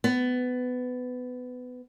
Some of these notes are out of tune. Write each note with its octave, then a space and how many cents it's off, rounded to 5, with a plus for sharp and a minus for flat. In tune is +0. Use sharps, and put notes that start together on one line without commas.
B3 +20